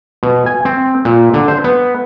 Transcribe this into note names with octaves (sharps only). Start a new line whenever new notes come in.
B2
G#5
C4
A#2
D3
C5
B3